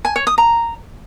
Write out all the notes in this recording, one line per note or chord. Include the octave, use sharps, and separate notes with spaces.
G#5
C#5
D#6
A#5